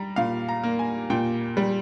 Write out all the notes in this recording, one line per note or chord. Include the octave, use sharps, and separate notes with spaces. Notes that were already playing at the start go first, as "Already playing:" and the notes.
Already playing: G3 A#5
A#2 F5
A#5
A#3
G#5
A#2 G5
G3